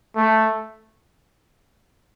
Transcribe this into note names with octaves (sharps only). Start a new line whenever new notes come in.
A3